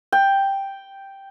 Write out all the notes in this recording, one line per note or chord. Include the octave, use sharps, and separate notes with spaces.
G5